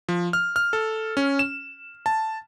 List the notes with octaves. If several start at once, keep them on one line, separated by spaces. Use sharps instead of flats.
F3
F6
F6
A4
C#4
E7
A5